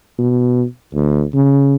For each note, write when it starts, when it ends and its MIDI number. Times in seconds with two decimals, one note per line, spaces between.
0.18 0.64 47
0.94 1.24 38
1.34 1.76 49